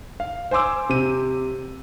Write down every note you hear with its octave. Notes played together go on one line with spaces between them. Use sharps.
F5
C5 G#5 C6 D6 E6
C3 D#7